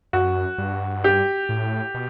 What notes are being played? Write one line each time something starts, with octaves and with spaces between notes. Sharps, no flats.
F#2 F#4
G2
G4
A2
B2